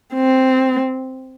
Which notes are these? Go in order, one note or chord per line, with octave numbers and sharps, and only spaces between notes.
C4